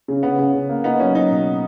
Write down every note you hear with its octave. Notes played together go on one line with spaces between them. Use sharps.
C#3
C#3 B3
C#3
C#3
A#3
B3 D#4
F#3 C#4
F#3 D#4
B2